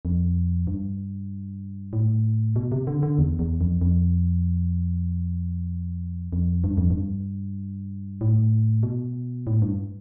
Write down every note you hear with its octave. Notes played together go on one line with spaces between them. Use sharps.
F2
G2
A2
B2
C3
D3
D3
E2
E2
F2
F2
F2
G2
F2
G2
A2
B2
A2
G2